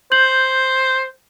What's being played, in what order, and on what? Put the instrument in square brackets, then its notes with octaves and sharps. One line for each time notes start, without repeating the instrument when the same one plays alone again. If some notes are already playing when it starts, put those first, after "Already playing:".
[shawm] C5 [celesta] G6 F#7